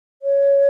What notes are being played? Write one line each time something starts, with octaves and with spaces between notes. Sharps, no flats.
C#5